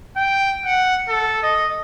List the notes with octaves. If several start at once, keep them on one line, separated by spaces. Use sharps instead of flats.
G5
F#5
A4
D#5